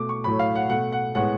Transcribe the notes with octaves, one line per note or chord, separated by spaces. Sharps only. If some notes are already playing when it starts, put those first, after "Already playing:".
Already playing: B2 A3 D6
C#6
A2 F#3 A3 B5
F5
F#5
B2 A3 F#5
F#5
A2 G#3 B3 F#5